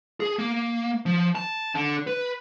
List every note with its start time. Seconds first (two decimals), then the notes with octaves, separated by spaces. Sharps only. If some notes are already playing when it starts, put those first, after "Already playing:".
0.20 G#4
0.39 A#3
1.06 F3
1.35 A5
1.75 D3
2.07 B4